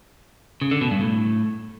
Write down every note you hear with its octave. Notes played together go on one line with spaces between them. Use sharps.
C#3
D3
B2
G2
A2